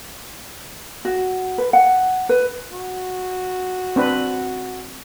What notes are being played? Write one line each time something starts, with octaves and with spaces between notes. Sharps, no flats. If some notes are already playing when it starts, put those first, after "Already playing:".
F#4
B4
F#5
B4
F#4
C4 D4 B4